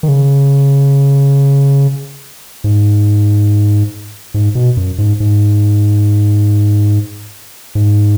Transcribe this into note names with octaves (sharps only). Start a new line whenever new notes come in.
D#3
C#3
G#2
G#2
B2
F#2
G#2
G#2
G#2